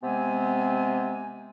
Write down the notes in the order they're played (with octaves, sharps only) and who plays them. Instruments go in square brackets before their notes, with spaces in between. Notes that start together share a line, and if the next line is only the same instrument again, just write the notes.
[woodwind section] C3 G#3 B3 C4 G#5